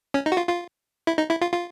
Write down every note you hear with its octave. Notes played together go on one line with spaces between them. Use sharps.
C#4
D#4
F#4
F4
F4
E4
D#4
E4
F4
F4